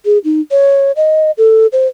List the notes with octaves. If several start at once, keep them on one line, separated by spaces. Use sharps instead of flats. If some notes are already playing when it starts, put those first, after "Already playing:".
G#4
D#4
C#5
D#5
A4
C5